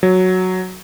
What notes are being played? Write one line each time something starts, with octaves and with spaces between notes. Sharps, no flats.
F#3